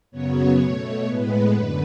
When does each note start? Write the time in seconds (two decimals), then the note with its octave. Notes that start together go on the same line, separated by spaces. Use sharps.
0.11 F#2 C#3 F#3 B3 C#5
0.58 B2 A3 C#5
1.06 A2 G#3 B3 B4
1.53 F#2 D3